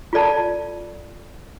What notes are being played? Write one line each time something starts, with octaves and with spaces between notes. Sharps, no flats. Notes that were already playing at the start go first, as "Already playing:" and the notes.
F4 A4 D5 A5